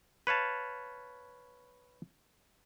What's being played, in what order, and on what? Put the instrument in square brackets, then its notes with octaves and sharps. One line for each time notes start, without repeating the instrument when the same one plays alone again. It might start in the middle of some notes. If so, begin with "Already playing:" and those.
[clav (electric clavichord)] B4 C#5 F5 A5